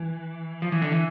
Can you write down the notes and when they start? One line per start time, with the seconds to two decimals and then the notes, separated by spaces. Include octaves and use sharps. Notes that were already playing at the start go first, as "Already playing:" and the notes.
Already playing: E3
0.62 F3
0.72 E3
0.82 D3
0.92 E3